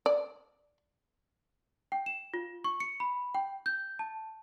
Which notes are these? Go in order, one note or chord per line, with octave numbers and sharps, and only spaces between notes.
D5
G5
E7
F4
C#6
C#7
B5
G5
G6
A5